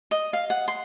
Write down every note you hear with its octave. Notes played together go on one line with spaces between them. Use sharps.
D#5
F5
F#5
C6